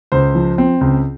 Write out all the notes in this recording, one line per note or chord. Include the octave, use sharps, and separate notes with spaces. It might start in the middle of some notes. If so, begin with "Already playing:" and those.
C#2 C5
F3
C4
C#2